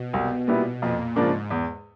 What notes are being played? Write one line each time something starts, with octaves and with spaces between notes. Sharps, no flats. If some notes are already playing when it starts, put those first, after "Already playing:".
Already playing: B2
C2
A#2 G3 B3 E4
F2 A#2
G#2 C#3 F3 A#3 D4
E2